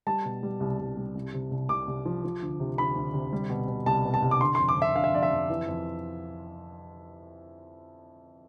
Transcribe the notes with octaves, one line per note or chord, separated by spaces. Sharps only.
G3 A5
B2
G3
C2
C2
G3
C2
C3
C2
C2 D6
C2
F3
F3
D2
C3
D2 B5
D2
C3
G3
B2
B2
C2 A5
B2
A5
C2
D6
D3 C6
F2 C6
D6
F2
E5
D3 F5
E5
F2 D5
E5
F2
E3
F2